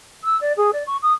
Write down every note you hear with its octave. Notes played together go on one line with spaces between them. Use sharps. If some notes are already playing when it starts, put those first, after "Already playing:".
E6
D5
G#4
D5
C#6
D#6